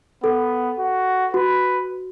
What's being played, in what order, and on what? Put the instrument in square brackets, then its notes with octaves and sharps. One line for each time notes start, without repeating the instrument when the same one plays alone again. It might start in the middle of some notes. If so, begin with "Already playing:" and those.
[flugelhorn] B3 [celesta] A4
[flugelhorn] F#4
[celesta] F#4 [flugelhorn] B4